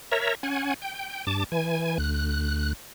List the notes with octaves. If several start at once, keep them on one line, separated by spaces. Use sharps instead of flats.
A#4 C#5 E5 A#5
C#4 F#5 G#5
G5
G2 A5 D6
E3 G#5
D2 F#6